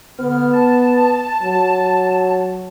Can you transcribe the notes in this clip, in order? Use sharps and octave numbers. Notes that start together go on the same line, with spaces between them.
D3 B3 F6
A5
F#3